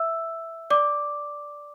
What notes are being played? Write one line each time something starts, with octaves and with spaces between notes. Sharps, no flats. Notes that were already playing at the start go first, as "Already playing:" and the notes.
Already playing: E5 E6
D5 D6